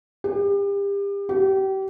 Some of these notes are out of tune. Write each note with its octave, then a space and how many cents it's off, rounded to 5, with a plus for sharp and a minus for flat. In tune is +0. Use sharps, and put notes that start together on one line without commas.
G4 +35
G4 -30